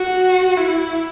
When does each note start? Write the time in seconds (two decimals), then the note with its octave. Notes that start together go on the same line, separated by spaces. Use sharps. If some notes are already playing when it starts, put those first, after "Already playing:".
Already playing: F#4
0.57 E4